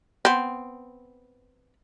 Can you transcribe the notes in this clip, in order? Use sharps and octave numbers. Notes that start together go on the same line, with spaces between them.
B3 C4